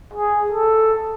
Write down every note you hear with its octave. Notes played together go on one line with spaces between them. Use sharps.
G#4
A4